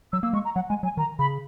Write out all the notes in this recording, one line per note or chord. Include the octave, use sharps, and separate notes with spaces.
F#3 E6
A#3 E6
G#3 C#6
A#5
F#3 F#5
G#3 G#5
F#3 G#5
D#3 A#5
C#3 B5